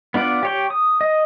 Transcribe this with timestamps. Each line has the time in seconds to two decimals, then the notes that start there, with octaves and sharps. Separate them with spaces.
0.14 B3 D4 F4 D5 F#5
0.43 G4 C#5 G5
0.70 D#6
1.01 D#5